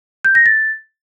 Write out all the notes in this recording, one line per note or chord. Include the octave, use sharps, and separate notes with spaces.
G6
A#6
A6